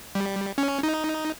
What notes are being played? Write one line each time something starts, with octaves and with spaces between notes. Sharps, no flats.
G3
C#4
D#4